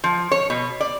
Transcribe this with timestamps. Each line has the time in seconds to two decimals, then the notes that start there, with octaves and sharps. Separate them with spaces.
0.04 F3
0.31 C#5
0.50 B2
0.80 D5